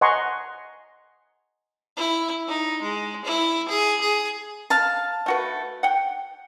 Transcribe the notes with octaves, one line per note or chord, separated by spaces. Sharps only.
D#5 F#5 G#5 A#5 C6 C#6
E4
D#4
G#3
E4
G#4
G#4
F5 A5
A3 F#4 B4
F#5 G5